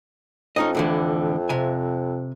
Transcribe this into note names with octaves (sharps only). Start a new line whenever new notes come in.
F2 C#4 D#4 D#5
A2 D3 E3
C3 E5 G#5